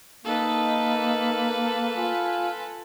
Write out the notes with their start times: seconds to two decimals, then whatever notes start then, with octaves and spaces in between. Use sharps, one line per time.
0.25 A#3 D#4 A4 B4
1.96 F4 G#5